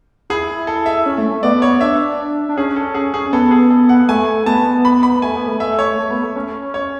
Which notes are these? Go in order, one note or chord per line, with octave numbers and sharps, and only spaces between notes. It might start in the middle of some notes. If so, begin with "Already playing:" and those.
E4 G#4
A4
E5
C#4
A3
A3
B3 D5
C#5
D4 E5
D4
C#4 G#4
A4
G#4
G#4
B3 A4
G#4
A4
F#5
A3 G#5
B3 A5
B5
B5
A3 G#5
B3
A3
E5
C#5
A3
B3
A3
C#4
C#5